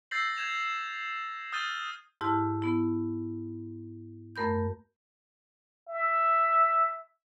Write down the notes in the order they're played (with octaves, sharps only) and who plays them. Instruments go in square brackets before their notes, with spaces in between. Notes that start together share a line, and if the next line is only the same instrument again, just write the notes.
[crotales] E6 G6 A6 A#6 C7 F#7
G6 G#6 E7 F7
D#6 F6 G6 A6 D#7 G7
[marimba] G#2 E4 G4 A5 F6
B3 E4
F#2 A3 A#4 B5 G6
[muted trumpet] E5